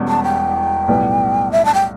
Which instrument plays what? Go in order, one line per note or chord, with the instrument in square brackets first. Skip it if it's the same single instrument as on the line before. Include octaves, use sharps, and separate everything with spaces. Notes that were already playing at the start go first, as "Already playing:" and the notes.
Already playing: [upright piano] E1 E2 B2 G3 C#4
[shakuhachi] A5
G5
[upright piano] B1 A2 G3 B3
[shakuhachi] E5
A5
G5